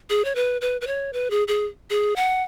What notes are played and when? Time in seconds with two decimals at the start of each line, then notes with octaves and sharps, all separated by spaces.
0.10 G#4
0.25 C#5
0.35 B4
0.61 B4
0.81 B4
0.87 C#5
1.13 B4
1.30 G#4
1.48 G#4
1.90 G#4
2.16 F#5